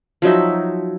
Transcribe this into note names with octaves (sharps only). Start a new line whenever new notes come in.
F3 F#3 D#4 E5